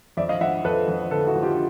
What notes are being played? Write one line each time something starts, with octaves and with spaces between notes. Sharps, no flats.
F2 D5 E5
D#5 F5
F3 E5 F#5
F2 A4 B4
F2
D3 A4 B4
E4 F#4
F3
F4 G4